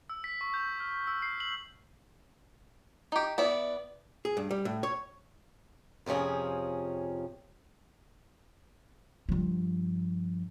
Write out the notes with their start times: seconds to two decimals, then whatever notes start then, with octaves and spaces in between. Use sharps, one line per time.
0.10 E6
0.24 B6
0.41 C#6
0.54 G6
0.80 F6
1.07 E6
1.22 C7
1.40 F#7
3.12 D#4 G4
3.38 B3 E4 D5 E5
4.25 G#4
4.37 G2
4.51 G3
4.65 A2
4.83 C#5
6.06 F2 C3 F3 C#4 G#4
9.29 G2 F3